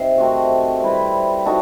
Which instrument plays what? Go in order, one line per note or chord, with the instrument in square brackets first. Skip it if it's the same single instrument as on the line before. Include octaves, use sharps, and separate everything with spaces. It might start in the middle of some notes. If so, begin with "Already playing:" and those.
Already playing: [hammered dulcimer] C3 D#4 [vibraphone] C5 E5
[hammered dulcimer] D#3 A3 C4 F#4
G3 C4 E4 B4
D#4 F#4 A4